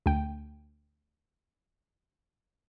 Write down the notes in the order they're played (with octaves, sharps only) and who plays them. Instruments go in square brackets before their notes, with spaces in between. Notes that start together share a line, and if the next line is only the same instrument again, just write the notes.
[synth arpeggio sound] D2 G5